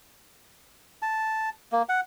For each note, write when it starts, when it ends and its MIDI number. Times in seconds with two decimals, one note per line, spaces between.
1.02 1.49 81
1.72 1.82 58
1.89 2.01 78